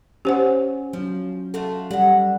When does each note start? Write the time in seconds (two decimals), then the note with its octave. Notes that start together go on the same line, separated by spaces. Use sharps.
0.25 C#4 G4 C5 F#5
0.93 F3 F#3 C#4
1.54 A3 F4 F#4 A4
1.91 B2 G3 F#5